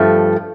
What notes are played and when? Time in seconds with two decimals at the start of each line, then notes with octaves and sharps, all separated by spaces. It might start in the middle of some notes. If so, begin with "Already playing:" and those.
Already playing: G2 F3 A3